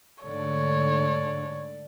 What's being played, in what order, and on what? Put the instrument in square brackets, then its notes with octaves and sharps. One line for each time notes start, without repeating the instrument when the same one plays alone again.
[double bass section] G#2 D3 A3 [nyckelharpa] A4 D5 [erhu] C#5